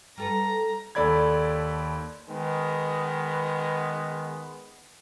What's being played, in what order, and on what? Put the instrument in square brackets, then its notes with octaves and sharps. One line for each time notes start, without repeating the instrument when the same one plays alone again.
[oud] G3 A4 B4 [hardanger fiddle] A#5
[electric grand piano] D#2 A4 D5 B5 G#6
[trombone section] D#3 G#3 B3